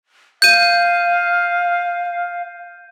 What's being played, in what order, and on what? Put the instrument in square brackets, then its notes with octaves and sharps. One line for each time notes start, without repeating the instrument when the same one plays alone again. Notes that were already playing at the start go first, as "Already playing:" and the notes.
[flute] F5 [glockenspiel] G6 D#7